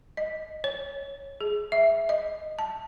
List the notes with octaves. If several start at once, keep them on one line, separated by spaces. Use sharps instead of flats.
D#5
C#5
G#4
E5
D#5
A5